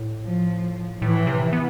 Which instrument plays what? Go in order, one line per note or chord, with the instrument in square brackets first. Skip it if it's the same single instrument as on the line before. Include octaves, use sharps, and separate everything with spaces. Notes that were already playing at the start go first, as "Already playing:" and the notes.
Already playing: [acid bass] A2
[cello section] F3
[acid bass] A2 [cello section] E3
[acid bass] C3
B3